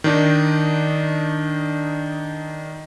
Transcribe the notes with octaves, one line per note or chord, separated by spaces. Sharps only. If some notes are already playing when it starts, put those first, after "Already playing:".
D#3 D4 D#4